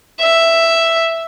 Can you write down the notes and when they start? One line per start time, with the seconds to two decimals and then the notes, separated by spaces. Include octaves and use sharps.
0.21 E5